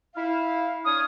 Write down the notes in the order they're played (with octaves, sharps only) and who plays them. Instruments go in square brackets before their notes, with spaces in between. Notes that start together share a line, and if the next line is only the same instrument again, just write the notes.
[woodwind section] E4 F5
[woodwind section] D4 C#5 F6 [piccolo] D#6